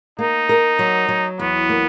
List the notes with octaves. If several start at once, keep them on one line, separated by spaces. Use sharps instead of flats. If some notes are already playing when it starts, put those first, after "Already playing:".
A#3 D#4
A#4
F#3
F#3
E2 B3
A#3